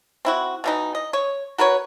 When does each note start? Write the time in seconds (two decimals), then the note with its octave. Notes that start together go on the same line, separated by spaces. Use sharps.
0.25 C4 E4 F#4
0.64 B2 E3 D#4
0.95 D#5
1.13 C#5
1.58 F#4 A#4 B4 C#5